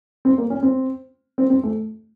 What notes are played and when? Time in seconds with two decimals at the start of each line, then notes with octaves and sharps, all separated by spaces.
0.25 C4
0.38 A#3
0.50 C#4
0.63 C4
1.38 C4
1.50 C4
1.63 A3